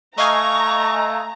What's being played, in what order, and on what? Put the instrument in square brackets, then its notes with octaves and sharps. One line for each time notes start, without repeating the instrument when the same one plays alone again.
[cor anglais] A3 [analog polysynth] D#5 F5 G#5 [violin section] A#5 [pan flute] C#6